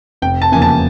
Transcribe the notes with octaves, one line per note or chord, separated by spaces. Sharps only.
F1 G5
A5
E2 C#3 F3 A#3 G#5
A5